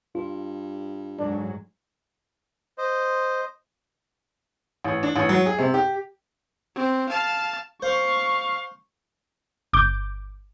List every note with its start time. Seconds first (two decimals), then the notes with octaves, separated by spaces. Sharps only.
0.15 G2 F4
1.19 G#2 D3 F#3 D4
2.78 C5 D#5
4.84 A1
5.03 D4
5.16 A1
5.29 F#3
5.46 G#4
5.58 C3
5.74 G4
6.75 C4
7.09 F5 A5
7.82 C5 F5 C#6
9.73 G1 D6 G6